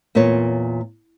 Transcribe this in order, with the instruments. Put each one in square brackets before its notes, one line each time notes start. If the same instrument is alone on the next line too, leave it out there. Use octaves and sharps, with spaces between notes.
[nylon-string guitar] E2 A#2 A#3 F4 C#5